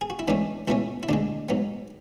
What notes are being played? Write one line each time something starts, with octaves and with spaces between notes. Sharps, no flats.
G#4
F#4
E4
G#2 E3 A3 C#4 D4
C#2 B2 A3 C#4 E4
E4
D2 D3 G#3 D4
G#2 F#3 B3